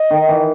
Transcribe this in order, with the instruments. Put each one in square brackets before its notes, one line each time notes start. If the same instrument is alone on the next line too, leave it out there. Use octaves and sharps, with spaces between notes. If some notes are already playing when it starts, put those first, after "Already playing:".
Already playing: [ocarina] D#5
[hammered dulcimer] D#3
E3